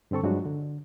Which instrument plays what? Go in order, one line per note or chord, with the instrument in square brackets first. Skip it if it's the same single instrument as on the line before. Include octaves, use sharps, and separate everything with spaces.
[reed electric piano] G2 D3 C4 A4 C#6
G2 F3 F#3 G#3 D4 F#4
D3